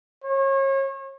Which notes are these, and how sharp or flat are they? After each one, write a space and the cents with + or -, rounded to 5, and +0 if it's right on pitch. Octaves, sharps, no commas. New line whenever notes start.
C#5 -35